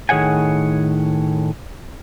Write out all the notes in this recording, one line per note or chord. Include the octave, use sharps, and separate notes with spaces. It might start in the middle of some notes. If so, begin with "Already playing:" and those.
A2 D#3 G#4 C#5 F#5 G#5